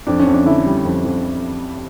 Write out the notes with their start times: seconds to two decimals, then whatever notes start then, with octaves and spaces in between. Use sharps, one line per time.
0.07 F2 D4
0.19 C#4
0.26 F2
0.34 D4
0.46 D3 E4
0.66 G3
0.85 F2
1.05 F2